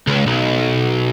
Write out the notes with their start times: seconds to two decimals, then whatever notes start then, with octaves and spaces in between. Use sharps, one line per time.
0.07 C#2
0.27 B1